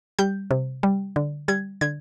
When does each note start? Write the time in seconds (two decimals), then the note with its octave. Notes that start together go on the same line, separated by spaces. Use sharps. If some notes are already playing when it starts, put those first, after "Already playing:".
0.19 G3 G6
0.51 C3
0.83 G3
1.16 D3
1.48 G3 G#6
1.81 D3 G#6